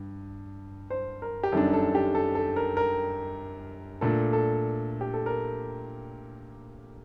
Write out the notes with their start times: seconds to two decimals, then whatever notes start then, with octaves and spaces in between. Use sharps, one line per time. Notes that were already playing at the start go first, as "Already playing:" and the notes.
Already playing: G2
0.90 C5
1.22 A#4
1.43 G4
1.52 F#2 D#3 G3 D4 A4
1.73 A4
1.95 G4
2.15 A4
2.35 A4
2.56 A#4
2.77 A#4
4.01 A#2 A3 D4 A4
4.33 A4
5.01 G4
5.14 A4
5.26 A#4